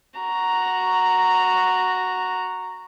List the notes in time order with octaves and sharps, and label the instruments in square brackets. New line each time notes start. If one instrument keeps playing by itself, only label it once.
[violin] F#4 A#5